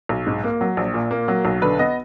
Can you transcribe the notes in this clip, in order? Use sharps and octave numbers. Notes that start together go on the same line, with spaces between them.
B1
G#2
A#3
F#3
A#1
A#2
A#3
F#3
B1
D3 B4
B3 D#5